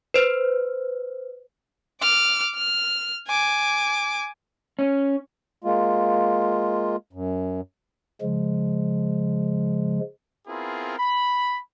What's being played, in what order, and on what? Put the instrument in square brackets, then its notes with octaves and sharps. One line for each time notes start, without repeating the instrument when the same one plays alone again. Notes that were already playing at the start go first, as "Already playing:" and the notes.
[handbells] B4 C5
[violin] D6 F6
F6
G#5 D6
[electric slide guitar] C#4
[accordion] G#3 A#3 F4
F#2
[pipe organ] C#3 F3 G#3
[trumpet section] B3 C4 E4 F4 G#4 A#4
B5